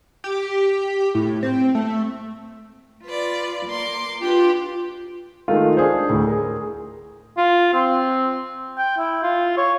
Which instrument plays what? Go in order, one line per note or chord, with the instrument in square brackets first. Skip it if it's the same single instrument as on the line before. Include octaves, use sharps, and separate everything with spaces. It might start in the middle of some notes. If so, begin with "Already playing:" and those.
[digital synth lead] G4
A2
C4
A3
[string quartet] F4 B4 D5
A#3 C6 D6
[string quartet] D4 G4 B4 [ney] F4
[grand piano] D#3 G#3 A3 F4
D4 G#4 C5
D2 A2
G#4 A#4
[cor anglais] F4
C4
G5
E4
F4
C#5